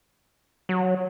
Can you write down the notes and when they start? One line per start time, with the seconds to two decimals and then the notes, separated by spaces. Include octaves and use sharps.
0.69 F#3